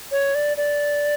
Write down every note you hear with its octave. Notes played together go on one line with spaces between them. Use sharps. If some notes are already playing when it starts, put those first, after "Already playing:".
C#5
D5
D5